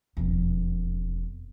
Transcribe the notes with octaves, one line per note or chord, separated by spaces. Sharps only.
E1 F2